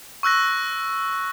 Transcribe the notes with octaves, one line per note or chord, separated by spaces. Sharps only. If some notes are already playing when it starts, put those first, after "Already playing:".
C#6 E6 F#6 A#6